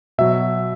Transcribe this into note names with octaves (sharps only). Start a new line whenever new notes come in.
B2 F#3 E5